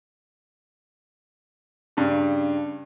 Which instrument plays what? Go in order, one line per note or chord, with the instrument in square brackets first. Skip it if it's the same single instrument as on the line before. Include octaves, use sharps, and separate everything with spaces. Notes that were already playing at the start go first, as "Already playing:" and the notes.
[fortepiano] G2 C#3